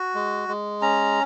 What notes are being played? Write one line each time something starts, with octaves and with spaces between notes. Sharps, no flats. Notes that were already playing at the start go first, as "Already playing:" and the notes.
Already playing: F#4
G#3
G#3
C#4 A#5